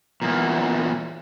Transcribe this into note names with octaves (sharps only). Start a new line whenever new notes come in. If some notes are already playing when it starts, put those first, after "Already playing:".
E2 A#2